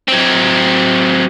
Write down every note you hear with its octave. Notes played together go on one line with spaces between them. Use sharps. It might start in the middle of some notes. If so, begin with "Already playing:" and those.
F#3 C4